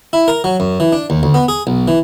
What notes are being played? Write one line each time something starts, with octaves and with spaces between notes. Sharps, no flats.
E4
A#4
F#3
F#2
E3
D4
D#2
D2
B3
G#4
B1
E3